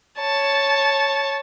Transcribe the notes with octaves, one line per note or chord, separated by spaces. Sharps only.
C#5 A5